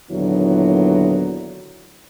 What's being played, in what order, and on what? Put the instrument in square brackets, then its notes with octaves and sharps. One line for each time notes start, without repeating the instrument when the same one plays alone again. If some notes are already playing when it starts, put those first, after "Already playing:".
[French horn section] D#2 A#2 D3 F#3 B3 E4